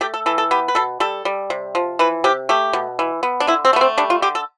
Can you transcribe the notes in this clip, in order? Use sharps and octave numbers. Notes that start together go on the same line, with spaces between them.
A3 G4
A4
E3 A4
A4
B3 G4
B4
B2 A4
G3 A4
G3
C3
F3
E3 B4
C3 G4
A3 G4
B2
E3
B3
D4
D3 E4
C4
A3 B3
C4
G3 D4
F4
D3 G4
A4